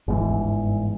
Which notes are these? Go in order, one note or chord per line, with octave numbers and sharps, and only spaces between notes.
G1 G#2 C3 E3